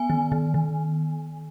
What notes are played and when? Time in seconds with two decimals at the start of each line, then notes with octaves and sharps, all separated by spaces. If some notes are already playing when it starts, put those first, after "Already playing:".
Already playing: B3 G#5
0.10 D#3
0.32 D#3
0.54 D#3